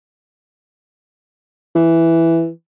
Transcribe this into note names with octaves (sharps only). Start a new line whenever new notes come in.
E3